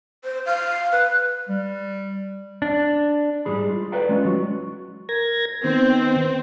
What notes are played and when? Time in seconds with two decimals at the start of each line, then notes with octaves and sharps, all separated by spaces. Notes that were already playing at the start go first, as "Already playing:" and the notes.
0.24 C5
0.46 F5
0.92 B4
1.49 G3
2.62 D4
3.45 G#2 G3 G#4 B5
3.69 F4
3.92 A4 B4 D5 F5 G5 A#5
4.09 G#3 B3 C#4 F4
4.25 F#3 F#4
5.09 A#4 G#6 A#6
5.64 D#3 B3 C4